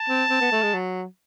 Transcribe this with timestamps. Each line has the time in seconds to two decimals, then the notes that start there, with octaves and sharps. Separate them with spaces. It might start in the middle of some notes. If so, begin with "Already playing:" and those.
Already playing: A5
0.09 C4
0.30 C4
0.41 B3
0.52 A3
0.63 G#3
0.74 F#3